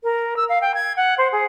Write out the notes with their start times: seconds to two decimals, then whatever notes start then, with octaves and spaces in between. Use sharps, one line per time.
0.03 A#4
0.37 E6
0.49 F5
0.61 G5
0.75 G#6
0.96 F#5
1.18 C5
1.32 G#4